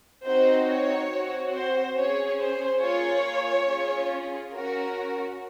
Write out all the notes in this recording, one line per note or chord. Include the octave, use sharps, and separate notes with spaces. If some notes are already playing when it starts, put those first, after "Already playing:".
C4 D#4 F#4 C5
C#5
C4 F#4
C5
C#4 G#4 C#5
C5
A#3 F4 G#4 C#5
C#4 F4 G#4
C#4 F#4 A#4